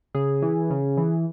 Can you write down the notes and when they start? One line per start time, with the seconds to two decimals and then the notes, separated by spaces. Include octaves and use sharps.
0.15 C#3 G#4
0.42 E3
0.70 C#3
0.97 E3